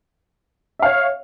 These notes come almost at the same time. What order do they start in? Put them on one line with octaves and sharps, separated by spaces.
E5 F5 C#5